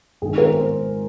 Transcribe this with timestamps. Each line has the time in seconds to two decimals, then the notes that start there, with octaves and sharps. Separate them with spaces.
0.22 G#1 G#2 D#3 G#4
0.38 A#4
0.54 C5